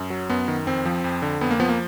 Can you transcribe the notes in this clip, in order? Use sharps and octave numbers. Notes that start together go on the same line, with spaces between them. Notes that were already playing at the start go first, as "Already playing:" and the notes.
Already playing: F#2
F#3
F#2 B3
D#3
F2 C4
F3
F2
D3
F2 B3
A#3
F3 B3
A#3